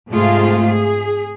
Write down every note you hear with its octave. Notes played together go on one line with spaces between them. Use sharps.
G#2 C3 A3 F4 G#4
G#4